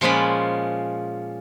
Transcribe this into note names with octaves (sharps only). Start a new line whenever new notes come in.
A#2 F3 G#3 C#4 D5 B5